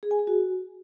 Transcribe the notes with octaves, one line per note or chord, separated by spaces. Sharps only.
G#4
G#5
G#4
F#4